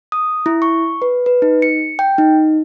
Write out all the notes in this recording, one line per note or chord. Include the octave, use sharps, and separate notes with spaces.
D#6
E4
C#6
B4
B4
D#4
C#7
G5
D#4